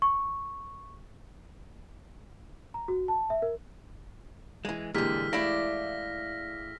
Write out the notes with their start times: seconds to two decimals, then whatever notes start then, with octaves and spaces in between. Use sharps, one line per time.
0.02 C#6
2.74 A#5
2.88 F#4
3.08 A5
3.30 E5
3.42 A#4
4.65 E3 G#3
4.94 A#2 D3 E3 G#3 G4 E6 F6 B6
5.33 A3 E4 D5 F5 A#6